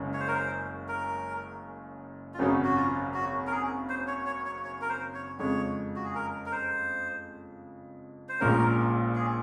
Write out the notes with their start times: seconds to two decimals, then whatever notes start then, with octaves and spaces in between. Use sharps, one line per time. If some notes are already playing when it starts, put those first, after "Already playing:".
Already playing: F#1 F#2 C#3 G#3 C#4
0.13 C#5
0.20 C5
0.28 A#4
0.35 C5
0.88 A#4
2.34 F4
2.39 G#1 F#2 C#3 F#3 C#4 D#4
2.64 F#4
2.76 F4
3.14 F#4
3.47 A#4
3.51 G#4
3.89 C5
4.08 C#5
4.26 C#5
4.46 C#5
4.64 C#5
4.81 A#4
4.89 C5
5.15 C#5
5.39 F2 C#3 G#3 C#5
5.96 F#4
6.05 G#4
6.15 A#4
6.46 A#4
6.52 C5
8.29 C5
8.40 A#1 A#2 G#3 C#4 A#4
9.15 G#4